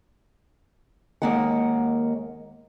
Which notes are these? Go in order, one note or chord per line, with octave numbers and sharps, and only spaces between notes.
D#2 C3 G#3 A#3 D#5 F#5